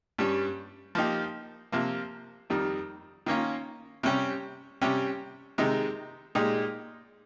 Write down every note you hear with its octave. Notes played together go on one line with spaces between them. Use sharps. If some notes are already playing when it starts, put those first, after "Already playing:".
G2 G3 C#4
F3 A#3 D#4 G4
C3 F3 A#3
F2 D#3 G3
D#3 A#3 C#4 F4
C3 G3 C#4 G4
C3 G3 C#4 G4
C3 D#3 G#3 D#4
A#2 G#3 D#4 G4